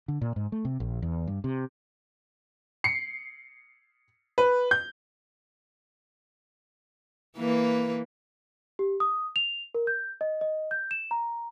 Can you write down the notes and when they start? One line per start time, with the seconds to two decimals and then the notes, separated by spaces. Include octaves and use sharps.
0.08 D3
0.21 A#2
0.36 G#2
0.52 A3
0.65 C3
0.80 A#1
1.02 E2
1.27 G2
1.44 C3
2.84 C7 C#7
4.38 B4
4.71 G6
7.37 E3 A#3 B4
8.79 G4
9.00 D#6
9.36 F7
9.75 A#4
9.87 G6
10.21 D#5
10.41 D#5
10.71 G6
10.91 E7
11.11 A#5